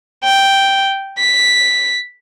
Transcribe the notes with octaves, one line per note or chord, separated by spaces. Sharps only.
G5
B6